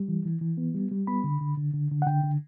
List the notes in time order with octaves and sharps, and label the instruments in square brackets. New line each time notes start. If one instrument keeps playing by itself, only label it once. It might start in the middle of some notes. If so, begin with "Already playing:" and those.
Already playing: [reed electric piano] G3
E3
E3
E3
B3
G3
G3
B3 B5
D3
D3
D3
D3
D3
F#5
D3 G5
D3